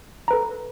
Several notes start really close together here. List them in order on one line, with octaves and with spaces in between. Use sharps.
A#5 B4 A4